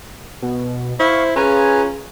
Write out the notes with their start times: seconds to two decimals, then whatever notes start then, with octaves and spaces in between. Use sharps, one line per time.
0.43 B2
0.99 E4 C5 F5 C#6
1.36 C#4 F4 G#4 B4 G#5 A#5